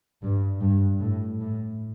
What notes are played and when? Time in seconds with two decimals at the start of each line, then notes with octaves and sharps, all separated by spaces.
0.22 G2
0.61 G2
1.01 A2
1.41 A2